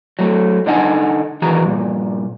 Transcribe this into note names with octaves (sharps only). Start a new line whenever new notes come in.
F#3 A3
D3 D4 D#4 D#5 F#5 G#5
D#3 E3 F#4 G#4 A#5
G2 A#2